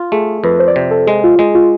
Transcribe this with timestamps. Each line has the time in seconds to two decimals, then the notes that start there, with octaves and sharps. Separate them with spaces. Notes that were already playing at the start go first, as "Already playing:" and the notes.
Already playing: F4
0.12 A3 G#4
0.44 F2 B4
0.59 C5
0.67 D5
0.76 C3 C5
0.91 A4
1.07 G#3 G#4
1.24 F4
1.39 G#3 G#4
1.55 F4